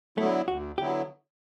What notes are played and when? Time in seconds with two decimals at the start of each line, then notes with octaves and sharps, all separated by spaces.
0.18 D3 F#3 A3 B3 E4
0.48 D2 F#4
0.78 D3 F#3 B3 E4 G4